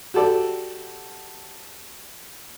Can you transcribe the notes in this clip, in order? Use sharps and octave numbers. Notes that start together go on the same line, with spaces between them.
F#4 G4 A4 D5